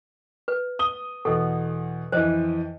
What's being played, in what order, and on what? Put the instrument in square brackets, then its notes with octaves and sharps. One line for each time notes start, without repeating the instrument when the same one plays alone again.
[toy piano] B4
[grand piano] D#6 G7
[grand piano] E2 B2 [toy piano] A4
[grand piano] F2 E3 [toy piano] C5 D#5